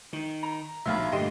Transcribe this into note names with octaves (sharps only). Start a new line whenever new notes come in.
D#3
A#5
A#1 D#2 B2 F#3 E5 F5 B5 C6
G2 A#2 D3 A3 G4 D#5 C6